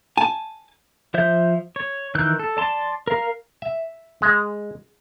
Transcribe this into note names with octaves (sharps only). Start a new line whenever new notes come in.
G#5 A5
F3 C5 E5 G6
C#5
D#3 E3 E6 F#6 G6
A4
D5 A5 C6
A#4 F5
E5
G#3